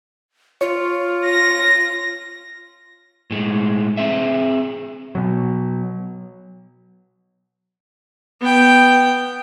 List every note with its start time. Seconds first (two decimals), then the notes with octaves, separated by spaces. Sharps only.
0.61 F4 C#5
1.26 A#6
3.31 A2 G#3
3.97 C4 G#4 E5
5.15 B2 F#3
8.41 B3 G5